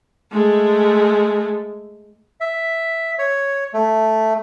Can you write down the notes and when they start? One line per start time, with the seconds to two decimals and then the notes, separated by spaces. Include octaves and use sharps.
0.32 G#3 A3
2.40 E5
3.19 C#5
3.74 A3